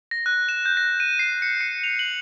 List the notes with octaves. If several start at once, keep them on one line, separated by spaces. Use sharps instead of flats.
A#6
F#6
E7
G6
A#6
D#7
C7
C#7
C#7
F7
F#7